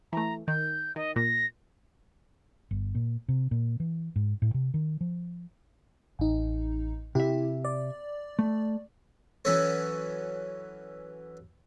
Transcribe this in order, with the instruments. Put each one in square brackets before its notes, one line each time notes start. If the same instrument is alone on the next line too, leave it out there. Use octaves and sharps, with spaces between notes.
[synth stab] E3 A3 [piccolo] A#5
[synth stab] D#3 [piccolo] G6
[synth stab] D#3 [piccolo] D#5
[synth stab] A#2 [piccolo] A#6
[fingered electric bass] G1
A#2
C3
A#2
E3
G#2
A2
C3
D#3
F3
[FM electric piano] A1 D#4
[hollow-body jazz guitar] C3 E5 [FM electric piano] E4 G4
[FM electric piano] D5
[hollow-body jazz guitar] A3
[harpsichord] E3 F#3 C#4 A4 C#5